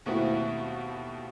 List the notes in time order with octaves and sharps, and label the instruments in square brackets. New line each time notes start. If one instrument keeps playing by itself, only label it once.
[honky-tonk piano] D#2 B2 A3 C4 E4 F#4